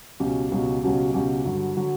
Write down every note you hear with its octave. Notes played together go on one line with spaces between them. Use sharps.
C#2 B2 F#3 C#4 G4
C#2 B2 F#3 C#4 G4
C#2 B2 F#3 C#4 G4
C#2 B2 F#3 C#4 G4
G2 D3 F#3
D3 F#3